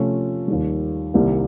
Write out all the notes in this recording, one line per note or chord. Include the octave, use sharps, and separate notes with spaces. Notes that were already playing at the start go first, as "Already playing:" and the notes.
Already playing: C3 F3 A3 C#4 F4
D#2 D#3 G3
C2 C3 D#3 G3 A#3